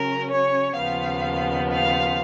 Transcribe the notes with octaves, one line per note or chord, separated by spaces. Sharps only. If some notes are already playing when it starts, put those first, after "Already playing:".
Already playing: C#3 F#3 C#4 A#4
C#5
D#2 C#3 F3 B3 F5
F5